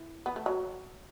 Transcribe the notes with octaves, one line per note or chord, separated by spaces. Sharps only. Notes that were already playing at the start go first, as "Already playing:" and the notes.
Already playing: E3
B3
A3
F#3